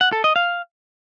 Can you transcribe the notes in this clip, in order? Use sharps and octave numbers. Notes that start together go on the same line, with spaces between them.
F#5
A4
D#5
F5